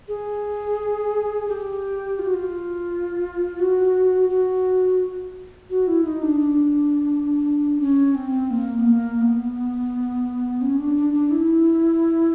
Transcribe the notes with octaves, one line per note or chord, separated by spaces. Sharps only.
G#4
G4
F4
F#4
F4
F#4
F#4
F#4
E4
D#4
D4
D4
C#4
C4
A#3
B3
A#3
B3
C#4
D4
D4
D4
E4